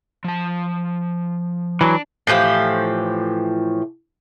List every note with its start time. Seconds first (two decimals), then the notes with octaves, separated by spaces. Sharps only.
0.24 F3 A5
1.81 E3 F#3 D4
2.27 A2 E3 F3 G4